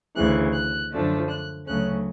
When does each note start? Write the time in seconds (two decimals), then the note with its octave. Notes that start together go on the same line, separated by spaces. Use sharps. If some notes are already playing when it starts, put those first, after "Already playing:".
0.15 D2 C#3 E3 F#6
0.54 F#6
0.92 F#2 D3 F3 A3 D4
1.30 F#6
1.68 D2 C#3 F#3 A3 C#4 F#6